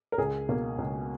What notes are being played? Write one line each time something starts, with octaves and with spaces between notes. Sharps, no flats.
A#4
C#2 G#4
B2 A#3
C#2